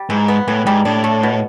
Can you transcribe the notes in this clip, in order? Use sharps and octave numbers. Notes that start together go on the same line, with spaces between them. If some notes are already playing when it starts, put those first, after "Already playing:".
Already playing: G3
G#2 E3
B3
A2 E3
G#2 G3
A2 D4
A3
B2